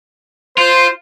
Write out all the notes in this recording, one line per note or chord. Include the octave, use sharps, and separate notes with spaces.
F4 C5